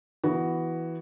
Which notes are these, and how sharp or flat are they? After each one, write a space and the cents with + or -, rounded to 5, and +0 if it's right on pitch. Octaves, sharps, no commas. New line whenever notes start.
E3 +0 B3 +0 F#4 +10